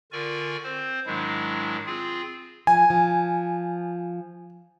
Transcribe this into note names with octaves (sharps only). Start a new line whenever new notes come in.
D3 F4 A#4 D5 G#5 C#6
C4 C5
G#2 D#3 F#3 G#3 D4 E4
C4 F4 G#4
F3 G#5
F3